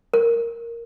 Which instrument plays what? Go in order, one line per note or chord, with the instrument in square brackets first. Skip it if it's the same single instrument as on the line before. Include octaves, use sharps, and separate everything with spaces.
[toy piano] A#4